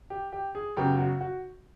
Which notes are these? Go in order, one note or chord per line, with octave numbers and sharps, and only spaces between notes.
G4
G4
G#4
F#2 C#3 F#3 B3 G4
F#4
F#4